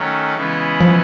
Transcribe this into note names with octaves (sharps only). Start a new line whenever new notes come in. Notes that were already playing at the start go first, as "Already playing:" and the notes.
Already playing: D#3 F#3 A3 C#4
C#3 E3 G#3 B3 E4
F3